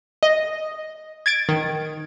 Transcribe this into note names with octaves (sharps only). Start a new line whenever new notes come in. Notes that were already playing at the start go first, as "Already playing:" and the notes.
D#5
G#6 A6 D7
D#3